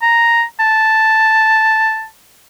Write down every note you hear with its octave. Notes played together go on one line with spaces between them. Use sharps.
A#5
A5